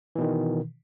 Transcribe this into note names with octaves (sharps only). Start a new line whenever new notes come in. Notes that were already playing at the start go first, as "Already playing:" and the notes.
B2 D#3 E3